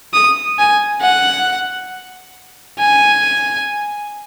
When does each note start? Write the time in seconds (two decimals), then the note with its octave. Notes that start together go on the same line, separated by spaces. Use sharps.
0.13 D#6
0.59 G#5
1.02 F#5
2.79 G#5